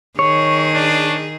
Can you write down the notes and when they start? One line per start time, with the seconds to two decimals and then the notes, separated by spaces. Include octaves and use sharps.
0.19 D#3 G#4 C#5
0.74 D4